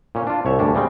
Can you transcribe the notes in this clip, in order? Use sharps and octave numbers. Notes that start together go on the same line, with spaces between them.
A#2 C#4
D4 F4
C2 C#5 E5
D2 G2 C#4 D4
C#3 G3 G#3 C4